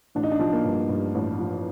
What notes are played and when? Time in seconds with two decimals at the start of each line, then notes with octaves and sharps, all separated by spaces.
0.15 A1 D4
0.23 D#4
0.32 D4
0.39 F3
0.53 A#3
0.64 G2
0.89 G2
1.15 A1
1.39 F3